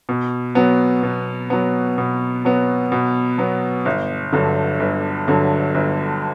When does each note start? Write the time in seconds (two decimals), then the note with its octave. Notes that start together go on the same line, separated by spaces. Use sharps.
0.09 B2
0.55 F#3 B3
1.03 B2
1.50 F#3 B3
1.98 B2
2.45 F#3 B3
2.92 B2
3.38 F#3 B3
3.86 G1
4.33 G2 D3 F#3
4.80 G1
5.28 G2 D3 F#3
5.74 G1